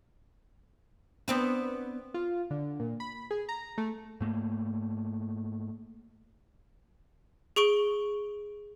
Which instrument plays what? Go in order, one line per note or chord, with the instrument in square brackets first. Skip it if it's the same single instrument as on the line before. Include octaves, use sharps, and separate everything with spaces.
[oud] B3 C4 D4
[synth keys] F4
D3
A#2
B5
G#4
A#5
A3
[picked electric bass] G#2 A3 A#3
[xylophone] G#4 C#6 D7 G7